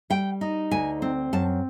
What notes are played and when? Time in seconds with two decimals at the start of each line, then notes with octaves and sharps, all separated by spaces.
0.10 G3 G5
0.41 D#4
0.71 D2 G#5
1.02 C4
1.33 F#2 A5